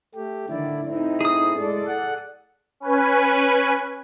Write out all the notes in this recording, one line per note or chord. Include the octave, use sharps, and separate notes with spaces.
A3 G4
A2 D3 D#3 E4 D5
C4 D#4 E4
G#4 D#6
G#3 A4 D5
F#5
C#4 B4 G#5